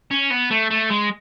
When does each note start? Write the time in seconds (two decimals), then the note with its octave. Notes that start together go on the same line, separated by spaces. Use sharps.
0.11 C#4
0.30 B3
0.50 A3
0.70 A3
0.90 G#3